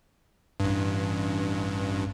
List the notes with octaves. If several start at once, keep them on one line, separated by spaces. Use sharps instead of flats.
A1 G2